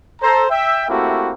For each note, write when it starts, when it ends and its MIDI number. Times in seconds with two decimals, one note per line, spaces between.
0.22 0.46 69
0.22 0.46 72
0.22 0.46 82
0.51 0.88 76
0.51 0.88 79
0.89 1.32 57
0.89 1.32 58
0.89 1.32 60
0.89 1.32 64
0.89 1.32 66
0.89 1.32 67